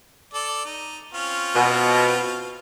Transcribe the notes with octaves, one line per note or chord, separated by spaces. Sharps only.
A4 D5
D#4
C4 C#4 F4
B2